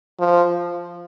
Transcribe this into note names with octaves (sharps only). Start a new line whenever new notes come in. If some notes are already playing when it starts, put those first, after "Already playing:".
F3